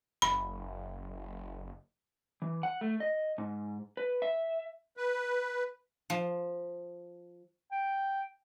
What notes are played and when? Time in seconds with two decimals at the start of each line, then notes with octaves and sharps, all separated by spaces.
0.22 F#1 B5
2.42 E3
2.63 F#5
2.81 A3
3.00 D#5
3.38 G#2
3.97 B4
4.22 E5
4.97 B4
6.10 F3
7.72 G5